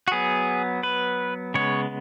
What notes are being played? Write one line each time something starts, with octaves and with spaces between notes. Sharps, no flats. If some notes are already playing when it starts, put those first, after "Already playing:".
F#4
F#3 B3 G#4
B4
C#3 G#3 B3 C#5